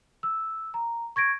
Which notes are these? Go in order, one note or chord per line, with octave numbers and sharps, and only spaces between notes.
E6
A#5
C#6 G#6 A#6 D7